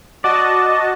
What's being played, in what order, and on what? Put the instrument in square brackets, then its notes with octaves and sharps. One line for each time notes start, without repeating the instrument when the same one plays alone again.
[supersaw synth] F#4 D#5 A5 [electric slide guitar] D5